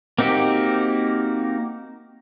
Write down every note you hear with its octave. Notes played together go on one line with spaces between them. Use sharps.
A#3 C4 D#4 F#4 G4